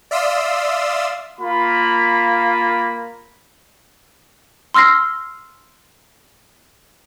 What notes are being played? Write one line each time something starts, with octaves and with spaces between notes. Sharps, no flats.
D5 E5 F5 C6 D#6 E6
A#3 F4 B5
C6 E6 F6 A#6 C7